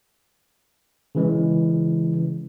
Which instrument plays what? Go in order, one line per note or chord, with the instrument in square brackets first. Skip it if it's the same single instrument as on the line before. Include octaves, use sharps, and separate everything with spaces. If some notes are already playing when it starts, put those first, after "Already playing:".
[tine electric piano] C#3 E3 G#3